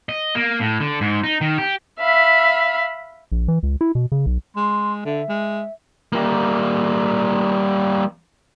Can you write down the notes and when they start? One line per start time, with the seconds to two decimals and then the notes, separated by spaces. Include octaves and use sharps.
0.09 D#5
0.35 A#3
0.60 A2
0.80 D3
1.01 G#2
1.24 D#4
1.41 D#3
1.58 G4
1.99 E5 F5 B5
3.32 A#1
3.48 E3
3.63 C#2
3.81 E4
3.95 B2
4.12 C#3
4.26 B1
4.56 G#3 C6
5.05 D3 E5
5.29 G#3
6.12 G3 A#3